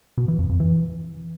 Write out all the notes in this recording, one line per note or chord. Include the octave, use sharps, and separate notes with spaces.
B2
E3
F2
F2
E3